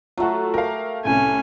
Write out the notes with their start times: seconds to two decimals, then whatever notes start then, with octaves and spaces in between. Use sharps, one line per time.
0.17 F#3 A3 F4 F#4
0.54 G4 A#4 F5
1.05 C2 A2 C#4 G#5